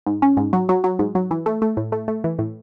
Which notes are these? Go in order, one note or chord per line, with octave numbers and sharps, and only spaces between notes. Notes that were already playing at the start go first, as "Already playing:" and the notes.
G#2
C#4
G#2
F#3
F#3
F#3
G#2
F#3
E3
A3
A3
A2
A3
A3
E3
A2